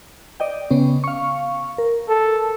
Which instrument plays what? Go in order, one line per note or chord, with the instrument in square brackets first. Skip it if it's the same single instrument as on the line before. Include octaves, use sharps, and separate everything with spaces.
[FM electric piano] D5 D#5 G5
C#3 B3 C#4
F5 C#6
A#4
[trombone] A4